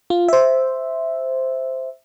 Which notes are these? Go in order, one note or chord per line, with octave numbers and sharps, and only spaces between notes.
F4
C5 E5